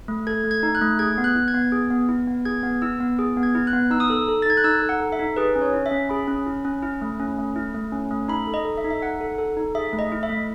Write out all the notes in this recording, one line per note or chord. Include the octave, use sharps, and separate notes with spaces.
A3
A4 G#6
A3
G#6
D#4
F#6
A3
G#4 G#6
B3
F#6
E4
G#6
B3
G#4
B3
E4
B3
G#4 G#6
B3
E4 E6
B3
G#4
B3
G#6
E4
F#6
B3
D#4 E6
D#6
A4 E6
A4
A6
D#4 G#6
F#6
D#4 E6
A4
F#5
A4
E5
D#4
G#4 B4
C#4
C#5
E4
E5
C#4
G#4 B5
C#4
E4
C#4
E4
A3
C#4
A3
E4
A3
C#4
A3
D#4 B5
A4
D#5
A4
E5
D#4
E5
D#4 F#5
A4
A4
D#4
G#4 E5
A3
D#5
E4
E5
A3